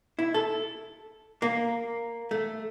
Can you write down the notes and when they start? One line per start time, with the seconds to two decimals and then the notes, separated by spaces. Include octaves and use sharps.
0.19 E4
0.34 A4
1.42 A#3
2.31 A3